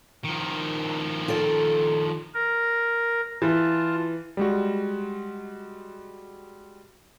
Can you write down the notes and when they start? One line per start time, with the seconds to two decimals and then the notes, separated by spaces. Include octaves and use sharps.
0.24 D#3 F3
1.28 F4 A4 D5
2.34 A#4
3.42 E3 F4 A5
4.37 G3 G#3 F#4